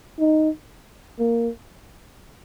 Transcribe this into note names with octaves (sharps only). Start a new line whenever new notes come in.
D#4
A#3